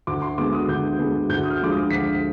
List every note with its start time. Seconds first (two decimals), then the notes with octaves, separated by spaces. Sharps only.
0.07 D2 D6
0.22 C6
0.38 D3 G#3 B3 D6
0.53 D#6
0.69 D2 G6
0.99 D3 G#3 B3
1.29 D2 G6
1.44 D#6
1.50 F6
1.60 D3 F3 G#3 D6
1.70 D#6
1.91 D2 B6